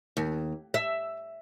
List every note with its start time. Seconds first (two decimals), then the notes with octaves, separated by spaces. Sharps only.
0.17 D#2
0.74 E5